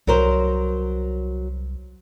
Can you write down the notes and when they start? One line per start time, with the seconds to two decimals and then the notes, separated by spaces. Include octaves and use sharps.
0.07 C2 F#3 A#4 C5